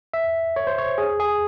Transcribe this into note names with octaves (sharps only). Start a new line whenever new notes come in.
E5
C#5
C5
C#5
G#4
G#4